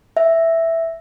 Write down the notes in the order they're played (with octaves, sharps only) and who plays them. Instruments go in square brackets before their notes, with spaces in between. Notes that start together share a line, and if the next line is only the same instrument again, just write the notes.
[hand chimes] E5